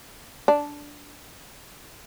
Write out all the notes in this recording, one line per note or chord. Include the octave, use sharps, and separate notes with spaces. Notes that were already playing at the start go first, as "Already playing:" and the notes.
D4